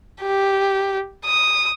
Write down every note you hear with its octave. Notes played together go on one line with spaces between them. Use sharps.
G4
D#6